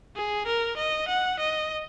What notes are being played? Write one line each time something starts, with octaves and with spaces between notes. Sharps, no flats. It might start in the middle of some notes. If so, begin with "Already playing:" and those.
G#4
A#4
D#5
F#5
D#5